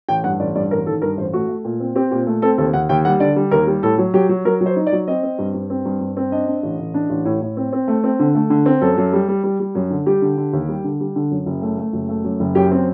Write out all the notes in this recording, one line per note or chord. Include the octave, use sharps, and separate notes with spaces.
A1 G5
G2 F#5
A1 D5
G2 D5
A1 A#4
D#3 A4
G2 A#4
A1 C5
A3 F#4
A3
A#2
C4
C4 G4
A#2 G4
A3
C4 A4
D#2 A4
D#2 F#5
D#2 G5
G3 F#5
D3 D5
G3
D#2 A#4
G3
A2 A4
F#3
F#3 G4
F#3
F#3 A#4
F#3
C5
D#4
D5
F#3
C4 D#5
C4
G2
G2
C4
G2
G2
C4
D4 D#5
D4
A1
A1
D4
A1
A2
A2
C4
C4
A3
C4
D3
A3
D3
C4
F#2 A4
F#2
G3
G3
G3
G3
F#2
D3
G3 G4
D3
D3
D#2
G3
D3
G3
D3
F#2
F#1
A3
A3
F#1
A3
F#2
F#1
F#2 G4
C4